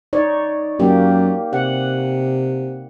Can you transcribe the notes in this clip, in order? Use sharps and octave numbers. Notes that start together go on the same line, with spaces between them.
D#4 C#5 D5
F#2 A#3 G4
C3 F#5